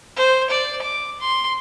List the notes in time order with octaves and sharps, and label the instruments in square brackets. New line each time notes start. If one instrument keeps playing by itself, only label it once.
[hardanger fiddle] C5
D5
D6
C6